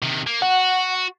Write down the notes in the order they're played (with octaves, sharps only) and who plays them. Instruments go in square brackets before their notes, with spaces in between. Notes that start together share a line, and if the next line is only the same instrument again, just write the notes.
[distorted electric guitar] C3 D#3
A#3
[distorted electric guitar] F#4 [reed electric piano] F#5